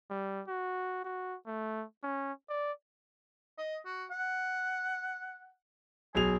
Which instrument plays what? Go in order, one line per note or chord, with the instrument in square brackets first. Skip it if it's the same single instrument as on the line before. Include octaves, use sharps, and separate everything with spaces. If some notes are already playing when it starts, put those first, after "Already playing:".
[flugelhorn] G3
F#4
F#4
A3
C#4
D5
[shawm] D#5
F#4
F#5
[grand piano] B1 G#4 F7 [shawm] G#5